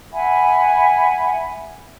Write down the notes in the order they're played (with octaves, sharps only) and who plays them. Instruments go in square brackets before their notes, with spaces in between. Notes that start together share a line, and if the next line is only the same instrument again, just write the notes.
[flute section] E5 F#5 G#5 B5